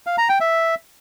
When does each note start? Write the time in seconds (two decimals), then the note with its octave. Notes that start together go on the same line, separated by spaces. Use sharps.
0.07 F5
0.18 A#5
0.29 G5
0.40 E5